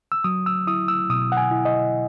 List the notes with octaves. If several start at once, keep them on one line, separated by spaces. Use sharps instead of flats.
E6
F#3 D#6
E6
E4 D#6
E6
B2 D#6
F#5
G#5
E4
D#5